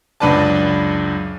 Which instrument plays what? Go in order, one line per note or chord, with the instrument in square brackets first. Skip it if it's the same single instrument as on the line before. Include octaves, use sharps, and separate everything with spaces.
[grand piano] C#2 F#2 D4 B4 D5 A5